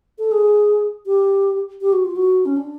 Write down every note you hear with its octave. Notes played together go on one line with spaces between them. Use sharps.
A4
G#4
G4
G4
F#4
F4
F#4
C#4
D4